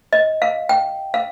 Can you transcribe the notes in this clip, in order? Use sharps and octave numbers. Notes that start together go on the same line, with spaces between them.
D#5
F5
G5
F5